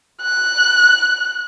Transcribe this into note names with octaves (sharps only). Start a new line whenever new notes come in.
F#6